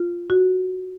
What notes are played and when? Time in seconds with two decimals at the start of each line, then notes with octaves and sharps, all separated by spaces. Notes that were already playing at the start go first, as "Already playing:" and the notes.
Already playing: F4
0.30 F#4